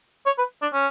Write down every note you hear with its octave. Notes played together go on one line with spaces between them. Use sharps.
C#5
B4
D4
C#4